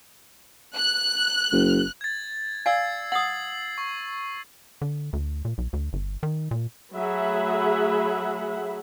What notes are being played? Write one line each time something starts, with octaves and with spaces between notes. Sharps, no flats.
F#6
F#1
G#6 A6
D5 F5 G#5 E6 G#6 C7
F#5 D#6 C7 F#7
C#6
D3
D2
A#2
B1
D2
G1
D#3
A#2
F#3 A3 G#4 E5 F#5 B5